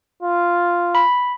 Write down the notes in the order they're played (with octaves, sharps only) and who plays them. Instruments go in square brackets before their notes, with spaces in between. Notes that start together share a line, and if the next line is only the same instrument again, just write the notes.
[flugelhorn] F4
[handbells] B5